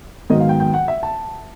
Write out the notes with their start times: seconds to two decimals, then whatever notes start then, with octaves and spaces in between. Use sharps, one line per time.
0.30 G#2 D#3 F#3 B3 D#5
0.40 F5
0.49 G5
0.60 G5
0.74 F#5
0.88 E5
1.03 A5